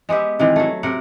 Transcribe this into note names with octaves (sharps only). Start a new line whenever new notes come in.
G#3 B3 G4 E5
C3 D#3 E3
F#3 A3
C3 A#4 F#5